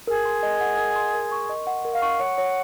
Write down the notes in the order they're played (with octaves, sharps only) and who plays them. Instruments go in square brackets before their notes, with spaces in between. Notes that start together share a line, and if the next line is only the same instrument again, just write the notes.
[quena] G#4 [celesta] A#4
[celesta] C6
D#5
F#5
A#4
C6
A#4
C#6
D#5
F#5
A#4
[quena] F5
[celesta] C#6
[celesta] C#5 [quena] F#5
[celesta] C#5